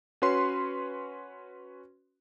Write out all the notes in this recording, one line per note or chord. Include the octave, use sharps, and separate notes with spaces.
C#4 F#4 B4 C#5 C6